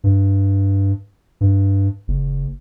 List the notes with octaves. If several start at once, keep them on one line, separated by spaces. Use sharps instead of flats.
G2
G2
F#1